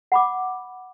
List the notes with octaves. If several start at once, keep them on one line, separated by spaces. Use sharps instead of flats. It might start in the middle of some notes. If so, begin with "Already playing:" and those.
F#5 B5 D6